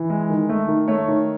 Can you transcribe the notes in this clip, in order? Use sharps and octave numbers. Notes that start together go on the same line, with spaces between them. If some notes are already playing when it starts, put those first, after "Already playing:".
Already playing: E3
G#3
D#3
A3
D#3
A3 C#5
D#3